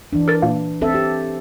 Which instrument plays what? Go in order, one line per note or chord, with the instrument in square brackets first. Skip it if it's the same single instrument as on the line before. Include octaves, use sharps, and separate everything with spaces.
[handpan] E3 D4
[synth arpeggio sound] A4 A#4 A6
A#2 A#3
[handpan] C4 A4 E5
G4